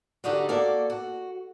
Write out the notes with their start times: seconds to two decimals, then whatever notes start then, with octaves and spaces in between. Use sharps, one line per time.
0.24 D3 D4 D#4 F#4 G4
0.49 A#3 F#4 A4 D5
0.90 F#4